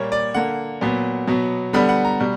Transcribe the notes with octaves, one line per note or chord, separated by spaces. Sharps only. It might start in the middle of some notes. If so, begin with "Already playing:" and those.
Already playing: A#2 G3 A#3 C#5
D5
D3 A#3 F#5
A#2 F#3 B3
B2 F#3 B3
D3 G3 B3 B5
F#5
A#5
B2 G3